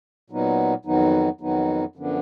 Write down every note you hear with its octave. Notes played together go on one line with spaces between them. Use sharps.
A#2 F#3 B3 D#4
F2 D#3 F#3 B3 D#4
F2 D#3 F#3 B3 D#4
F#2 D3 F3 B3 D4